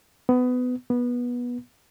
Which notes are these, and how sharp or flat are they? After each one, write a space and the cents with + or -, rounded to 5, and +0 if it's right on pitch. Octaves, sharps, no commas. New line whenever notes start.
B3 +20
B3 -20